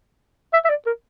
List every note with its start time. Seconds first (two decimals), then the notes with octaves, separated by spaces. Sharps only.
0.53 E5
0.64 E5
0.69 D5
0.86 A#4